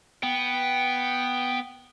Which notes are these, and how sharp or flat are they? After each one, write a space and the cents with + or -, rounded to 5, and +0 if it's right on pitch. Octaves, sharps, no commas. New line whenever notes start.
B3 +0 G5 +0